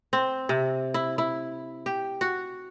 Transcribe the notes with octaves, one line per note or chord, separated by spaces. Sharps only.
C4
C3
E4
E4
G4
F#4